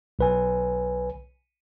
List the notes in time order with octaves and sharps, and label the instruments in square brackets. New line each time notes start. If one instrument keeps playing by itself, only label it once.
[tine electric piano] B1 B4 G#5